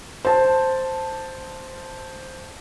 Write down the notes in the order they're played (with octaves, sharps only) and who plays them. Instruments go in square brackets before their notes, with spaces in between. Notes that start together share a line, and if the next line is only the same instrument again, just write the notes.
[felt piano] C5 A5